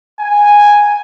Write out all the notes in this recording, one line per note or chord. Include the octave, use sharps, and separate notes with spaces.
G#5